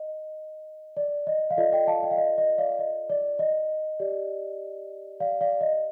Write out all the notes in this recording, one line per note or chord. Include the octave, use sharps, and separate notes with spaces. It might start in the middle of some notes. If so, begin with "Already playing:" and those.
Already playing: D#5
D5
D#5
F5
F4 A4 D5 D#5
D#5 G5
F5 A5
D#5 G5
F5
D#5
D#5
D5 F5
D#5
D5
D#5
G4 D5
D5 F5
D5 F5
D#5